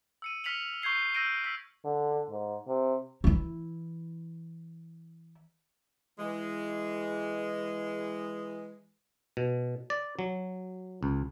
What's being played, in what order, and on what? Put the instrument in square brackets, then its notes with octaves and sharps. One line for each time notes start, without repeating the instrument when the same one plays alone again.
[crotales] E6 C#7 D#7
F6 B6 C#7 F7 F#7
C#6 G6 G#6 C7 G7
E6 G6 A#6 D7 D#7
E6 B6
[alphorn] D3
G#2
C3
[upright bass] E3 E4
[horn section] E3 G#3
[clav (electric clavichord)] B2
D5
F#3
C#2